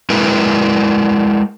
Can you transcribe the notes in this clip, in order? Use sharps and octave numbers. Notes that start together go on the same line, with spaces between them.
G#3 E4 A#4 B4